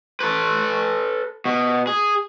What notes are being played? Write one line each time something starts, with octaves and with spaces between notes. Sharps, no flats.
A4 B4
B2
G#4